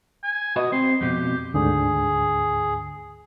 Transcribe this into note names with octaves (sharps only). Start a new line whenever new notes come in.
G#5
F#4 B4 D#5 D#6
C4 C6
F2 B2 G4
D2 G#2 D3 G#4